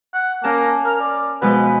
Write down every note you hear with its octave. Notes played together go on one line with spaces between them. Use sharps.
F#5
A#3 C#4 A#4 A5
A#4 F6
D5
B2 F3 G#3 B4